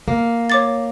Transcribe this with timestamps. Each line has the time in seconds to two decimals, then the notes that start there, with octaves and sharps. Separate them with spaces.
0.08 A#3
0.50 C#5 D6 A6